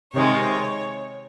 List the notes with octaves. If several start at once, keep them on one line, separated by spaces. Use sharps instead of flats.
C3 D#3 G#3 C#5